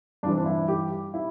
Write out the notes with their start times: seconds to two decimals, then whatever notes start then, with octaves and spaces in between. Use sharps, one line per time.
0.23 G2 D4
0.26 E3 C4
0.38 D4
0.46 E4
0.68 G4
1.14 E4